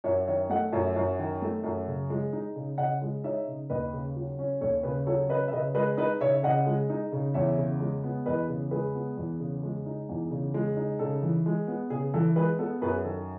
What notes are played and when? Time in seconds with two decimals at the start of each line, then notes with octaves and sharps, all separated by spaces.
0.04 F#2 C#5 E5
0.27 D#3 C#5 E5
0.50 A3 D#5 F#5
0.73 F#2 C#5 E5
0.96 F#2
1.19 D#3
1.42 A3
1.64 F#2
1.87 C#3
2.10 G#3
2.33 D#4
2.56 C#3
2.78 C#3 D#5 F#5
3.02 G#3
3.24 D#4 C#5 E5
3.47 C#3
3.70 D#2 B4 D#5
3.93 C#3
4.16 F#3
4.39 C#4
4.61 D#2 A4 C#5
4.83 C#3 G#4 B4
5.07 F#3 A4 C#5
5.29 C#4 B4 D#5
5.48 E5
5.52 C#3 B4 D#5
5.75 G#3 B4 D#5
5.97 D#4 B4 D#5
6.21 C#3 C#5 E5
6.43 C#3 D#5 F#5
6.66 G#3
6.90 D#4
7.12 C#3
7.34 E2 C#5 E5
7.58 C#3
7.80 G#3
8.04 B3
8.26 E2 B4 D#5
8.49 C#3
8.71 G#3 G#4 B4
8.94 B3
9.17 E2
9.40 C#3
9.63 G#3
9.86 D#4
10.09 E2
10.31 C#3
10.54 G#3
10.77 D#4
10.99 C#3 A4
11.23 E3
11.46 G#3
11.67 B3
11.90 C#3 G#4
12.14 E3 A4
12.36 G#3 G#4 B4
12.59 B3 A4
12.82 F#2 G#4 B4
13.04 D#3 A4